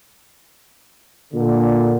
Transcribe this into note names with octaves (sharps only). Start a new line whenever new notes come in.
A#2 D3